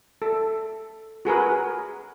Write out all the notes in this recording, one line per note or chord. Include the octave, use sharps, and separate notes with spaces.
A4
F#4 G#4 A#4 B4